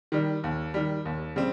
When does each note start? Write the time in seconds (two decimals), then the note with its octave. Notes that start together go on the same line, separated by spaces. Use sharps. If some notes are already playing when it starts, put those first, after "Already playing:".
0.12 D#3 G3
0.44 D#2
0.74 D#3 G3
1.06 D#2
1.36 C#3 G3 C4